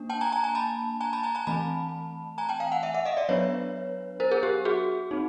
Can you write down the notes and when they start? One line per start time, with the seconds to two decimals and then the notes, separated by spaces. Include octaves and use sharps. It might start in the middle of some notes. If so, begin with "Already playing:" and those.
Already playing: A#3 D4
0.10 G5 A5
0.21 G#5 A#5
0.32 G#5 A#5
0.44 G#5 A#5
0.55 A5 B5
1.01 G#5 A#5
1.13 A5 B5
1.23 G#5 A#5
1.35 G#5 A#5
1.47 E3 A3 C4 A5 B5
2.38 G#5 A#5
2.49 G5 A5
2.60 F5 G5
2.72 F#5 G#5
2.83 E5 F#5
2.94 E5 F#5
3.05 D#5 F5
3.17 D5 E5
3.29 F#3 B3 D4 B4 C#5
4.20 A#4 C5
4.31 G#4 A#4
4.43 G4
4.65 F#4 G#4
5.11 C4 D#4